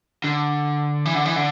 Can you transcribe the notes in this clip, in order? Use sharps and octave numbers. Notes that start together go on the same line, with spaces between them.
D3
E3
D3
E3
D3